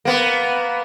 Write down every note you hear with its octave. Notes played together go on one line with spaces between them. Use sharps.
A#3 B3